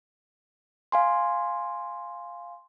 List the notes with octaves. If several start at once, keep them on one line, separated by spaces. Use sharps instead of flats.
F5 G#5 C6